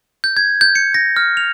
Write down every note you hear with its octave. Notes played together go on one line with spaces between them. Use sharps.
G6
G#6
G6
C#7
A#6
F6
F7